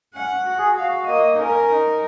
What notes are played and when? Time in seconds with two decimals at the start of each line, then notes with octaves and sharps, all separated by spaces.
0.14 C#4 F#5
0.45 F#4
0.58 G#4
0.72 F#4
0.77 F5
1.07 A#3 D#5
1.35 D#4
1.39 C#4 A#4
1.71 D#4